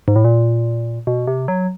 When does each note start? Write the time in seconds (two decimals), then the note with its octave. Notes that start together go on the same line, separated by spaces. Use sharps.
0.08 G#2
0.16 A2
0.24 A#2
1.07 B2
1.27 C3
1.48 F#3